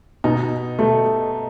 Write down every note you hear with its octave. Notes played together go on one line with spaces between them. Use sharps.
B2 D#4
B2 A3